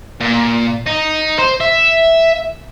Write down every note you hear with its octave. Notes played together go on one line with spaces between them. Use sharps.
A#2
D#4
C5
E5